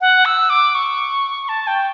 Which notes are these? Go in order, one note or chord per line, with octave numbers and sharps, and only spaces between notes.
F#5
E6
D6
C#6
A5
G5